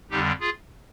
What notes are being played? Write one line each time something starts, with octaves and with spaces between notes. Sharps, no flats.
F2 D3 G3 D#4 G4
F4 G#4